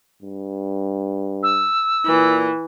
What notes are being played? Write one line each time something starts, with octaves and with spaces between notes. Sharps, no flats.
G2
E6
A#2 E3